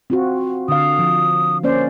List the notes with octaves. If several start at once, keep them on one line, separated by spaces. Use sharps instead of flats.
C4 F4 F#4
D3 F5 D#6
F3
A#3 C#4 C5 D5